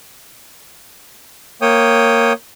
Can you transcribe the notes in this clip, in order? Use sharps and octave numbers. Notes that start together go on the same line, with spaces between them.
A#3 C#5 G5 D#6